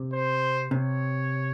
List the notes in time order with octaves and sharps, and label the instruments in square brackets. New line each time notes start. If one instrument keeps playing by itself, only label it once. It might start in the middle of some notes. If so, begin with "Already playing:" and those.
Already playing: [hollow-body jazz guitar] C3
[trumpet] C5
[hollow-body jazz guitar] C3 [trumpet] C#5